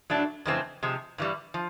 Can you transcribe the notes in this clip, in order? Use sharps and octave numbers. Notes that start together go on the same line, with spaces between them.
A2 F#3 A3 D4
F2 C#3 E3 A3 C4
C3 F3 G#3
G2 E3 G3
F3